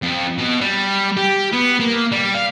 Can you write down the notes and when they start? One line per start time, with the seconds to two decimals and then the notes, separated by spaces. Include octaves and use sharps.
0.02 F2
0.38 B2
0.61 G3
1.17 G4
1.53 B3
1.80 A#3
2.12 G3
2.34 F5